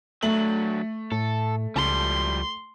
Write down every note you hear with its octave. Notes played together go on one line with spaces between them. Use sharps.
F#3 A3 D4 F#7
A2 A4
C#2 F3 G3 C6